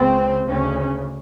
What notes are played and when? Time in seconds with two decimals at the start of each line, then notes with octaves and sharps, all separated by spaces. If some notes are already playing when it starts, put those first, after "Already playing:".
Already playing: C#2 C#3 C4
0.47 D2 C#3 C#4